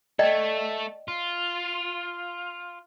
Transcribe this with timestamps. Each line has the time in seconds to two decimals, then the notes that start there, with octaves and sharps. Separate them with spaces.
0.19 A3 A4 D5 D#5 G5
1.08 F4